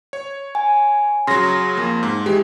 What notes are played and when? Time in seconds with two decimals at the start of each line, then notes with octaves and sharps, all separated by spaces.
0.13 C#5
0.55 G#5
1.27 C#3 F#3 C6 A#6
1.77 F2 A#3
2.03 G#2
2.26 E3 G#3 G4